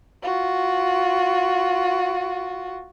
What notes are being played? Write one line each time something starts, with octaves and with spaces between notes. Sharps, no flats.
F4 F#4